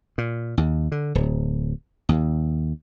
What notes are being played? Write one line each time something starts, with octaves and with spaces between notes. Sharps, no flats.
A#2
D#2
D3
D1
D#2